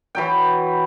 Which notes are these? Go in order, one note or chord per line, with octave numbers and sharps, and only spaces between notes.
E3 F#3 G5